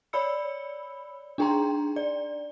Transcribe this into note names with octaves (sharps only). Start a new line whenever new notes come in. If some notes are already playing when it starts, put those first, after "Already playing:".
C#5 D5 B5 E6 C#7
D4 D#4 G#4 G5 A#5 C6
D5